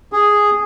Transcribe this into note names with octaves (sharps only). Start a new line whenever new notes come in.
G#4